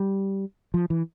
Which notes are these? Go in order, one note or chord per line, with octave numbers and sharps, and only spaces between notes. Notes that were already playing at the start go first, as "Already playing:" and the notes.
Already playing: G3
F3
E3